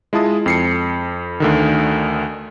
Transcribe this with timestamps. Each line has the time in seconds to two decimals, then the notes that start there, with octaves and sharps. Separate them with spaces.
0.13 G#3 E4 F4 A5 D#6
0.46 F2 C7 C#7
1.40 D2 D3 D#3